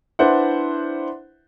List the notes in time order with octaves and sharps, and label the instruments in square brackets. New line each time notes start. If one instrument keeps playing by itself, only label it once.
[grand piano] D4 E4 B4 C5 E5 F#5